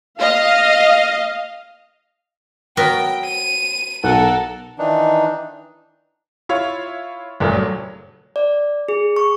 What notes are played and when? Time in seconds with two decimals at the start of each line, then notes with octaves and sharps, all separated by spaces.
0.21 D#5 F5
2.77 F#3 B3 A#4 G5
3.24 D#7
4.04 B1 A4 A#4 F#5
4.78 D#3 E3 D4 D#4
6.49 E4 F4 C#5 F5
7.40 F#1 G2 A#2 A3 A#3
7.53 F#3
8.36 D5
8.89 G#4
9.16 C#6